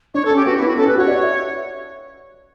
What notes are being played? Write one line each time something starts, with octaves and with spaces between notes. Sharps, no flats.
D4 C#5
A4
C#4
G4
B3 F#4
B3 E4
F#4
C#4 A4
G4 B4
F#4 C#5
D5
E5